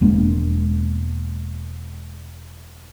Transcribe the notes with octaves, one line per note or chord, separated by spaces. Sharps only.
E1 G#3 A#3 D4